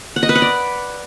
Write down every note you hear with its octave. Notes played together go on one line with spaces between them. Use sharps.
F#5
D#5
B4
F#5
D5